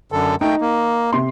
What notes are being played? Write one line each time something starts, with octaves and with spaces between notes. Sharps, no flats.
F#2 D3 A4
A3 D#4 G5
A#3
C3 C6